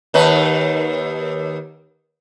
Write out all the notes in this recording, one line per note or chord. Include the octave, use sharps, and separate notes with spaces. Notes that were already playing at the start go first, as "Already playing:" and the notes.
D#2 D#3 B4